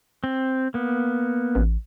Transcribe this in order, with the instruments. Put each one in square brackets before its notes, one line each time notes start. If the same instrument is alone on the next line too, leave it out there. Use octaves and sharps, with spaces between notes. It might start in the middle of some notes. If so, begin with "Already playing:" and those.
[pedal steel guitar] C4
A#3 B3
[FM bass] A1